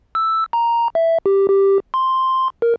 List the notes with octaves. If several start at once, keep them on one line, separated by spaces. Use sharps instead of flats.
E6
A#5
E5
G4
G4
C6
A#4